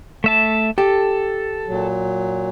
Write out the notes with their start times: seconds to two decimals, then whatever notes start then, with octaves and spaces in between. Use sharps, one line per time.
0.24 A3 E5 A5
0.78 G4 A4
1.67 A#2 F#3